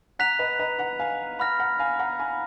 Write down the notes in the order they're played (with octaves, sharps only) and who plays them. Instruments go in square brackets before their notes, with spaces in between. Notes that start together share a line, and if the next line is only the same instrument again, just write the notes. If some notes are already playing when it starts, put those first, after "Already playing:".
[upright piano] F#5 A#5 [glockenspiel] F#6 B6 F7
[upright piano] B4 D#5
B4 D#5
F#5 A#5
F5 G#5
[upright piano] F#5 A#5 [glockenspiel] B5 F6 A#6
[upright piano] F#5 A#5
F5 G#5
F#5 A#5
G#5 B5